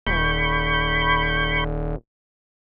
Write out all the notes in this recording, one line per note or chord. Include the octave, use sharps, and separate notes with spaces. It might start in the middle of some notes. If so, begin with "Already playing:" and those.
D#1 B5 C#6 G6